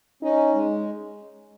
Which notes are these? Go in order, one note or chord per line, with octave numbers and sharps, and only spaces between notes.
C#4 D#4
G#3